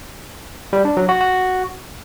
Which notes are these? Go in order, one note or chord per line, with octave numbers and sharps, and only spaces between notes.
G3
D4
F#3
F#4
F#4